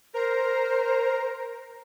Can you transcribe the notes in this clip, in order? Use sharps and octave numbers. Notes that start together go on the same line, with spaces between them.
A#4 C5 A#5